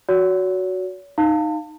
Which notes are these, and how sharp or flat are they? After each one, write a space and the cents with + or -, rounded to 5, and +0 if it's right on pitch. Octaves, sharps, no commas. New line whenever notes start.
F#4 +0 C#5 +40
D#4 -5 F5 +0 A5 +35